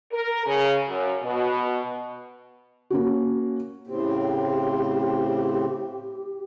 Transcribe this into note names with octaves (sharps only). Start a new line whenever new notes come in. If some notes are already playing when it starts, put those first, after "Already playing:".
A#4
C#3
F#2
B2
A#3 C#4 F#4
A2 C#3 C4 G4